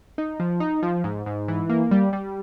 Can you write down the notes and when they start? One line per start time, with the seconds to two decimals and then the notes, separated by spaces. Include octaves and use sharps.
0.18 D#4
0.40 F3
0.60 D#4
0.82 F3
1.04 G#2
1.26 G#2
1.48 E3
1.69 A#3
1.91 G3
2.13 G3